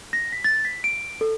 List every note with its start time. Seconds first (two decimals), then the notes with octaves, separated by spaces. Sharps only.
0.13 A#6
0.32 B6
0.44 A6
0.65 B6
0.84 D7
1.21 A4